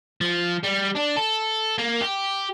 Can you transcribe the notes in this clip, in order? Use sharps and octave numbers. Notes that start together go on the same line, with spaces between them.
F3
G3
D4
A4
A#3
G4